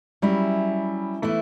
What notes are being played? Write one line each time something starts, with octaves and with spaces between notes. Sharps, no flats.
F#3 G3 C#4 E4
E3 A3 B3 E4